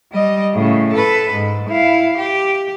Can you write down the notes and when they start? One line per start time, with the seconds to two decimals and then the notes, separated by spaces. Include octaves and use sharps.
0.13 G3 D#5
0.53 A2 C#3
0.93 A4 B4
1.33 G#2
1.69 E4 F5
2.17 G4